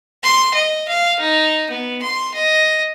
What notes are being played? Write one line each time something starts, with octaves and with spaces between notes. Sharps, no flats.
C6
D#5
F5
D#4
B3
C6
D#5